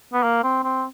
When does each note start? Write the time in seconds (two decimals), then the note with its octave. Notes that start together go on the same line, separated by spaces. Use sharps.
0.13 B3
0.23 A#3
0.44 C4
0.64 C4